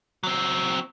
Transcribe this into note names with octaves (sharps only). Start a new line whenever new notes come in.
F#3 C4